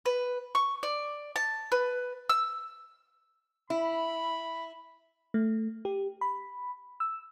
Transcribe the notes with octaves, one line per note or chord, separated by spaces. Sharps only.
B4
C#6
D5
A5
B4
E6
E4 B5
A3
G4
B5
E6